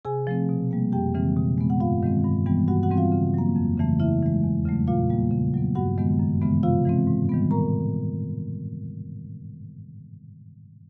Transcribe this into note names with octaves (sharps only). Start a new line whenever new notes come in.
C3 G#4 G#5
F3 A3 C4
B2
G3 A#3
F2 G4 G5
C#3 E3 G#3 C4
B2
G#3 B3
F#5
G2 F4 F5
D#3 G#3 C4
G2
E3 G3 B3
G2 F#4 F#5
F#4 F#5
E3 G3 C4
F4 F5
C#3
F#3 A#3
F2
C#3 E3 A3
C#3 E4 E5
E3 G#3
E2
C#3 F#3 A3
A#2 F4 F5
G3 A#3
C#3
F#3 B3
G2 F#4 F#5
D#3 G#3 B3
F#2
C#3 E3 G#3 B3
C3 F4 F5
E3 G#3 C4
G#2
D#3 G3 B3
A2 A#4 A#5